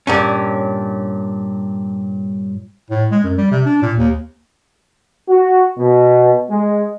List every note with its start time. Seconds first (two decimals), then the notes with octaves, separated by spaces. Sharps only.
0.07 G2 A#2 C#4
2.90 A2
3.11 G#3
3.24 F#2
3.38 G3
3.51 C3
3.65 D4
3.82 A#2
3.98 D#2
5.29 F#4
5.79 B2
6.50 G#3